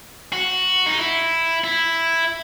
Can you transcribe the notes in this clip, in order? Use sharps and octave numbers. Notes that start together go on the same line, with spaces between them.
F#4
D#4
E4
E4